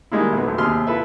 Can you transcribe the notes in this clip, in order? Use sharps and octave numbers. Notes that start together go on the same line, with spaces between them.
D#3 G3 G#3 A#3 E4
B1 B3
D2 A2
D#2 C3 G#4 B5 C6 F6
E4 F4 A4 B4 E5